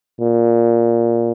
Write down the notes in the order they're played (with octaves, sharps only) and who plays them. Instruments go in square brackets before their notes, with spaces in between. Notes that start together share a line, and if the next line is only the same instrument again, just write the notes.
[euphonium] A#2